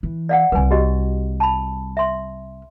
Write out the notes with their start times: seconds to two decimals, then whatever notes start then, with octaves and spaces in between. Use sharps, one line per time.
0.03 E3
0.29 D5 F5 F#5
0.52 C2 G3 B4 G#5
0.71 F#4 G4 D#5
1.40 A5 B5
1.97 E5 C6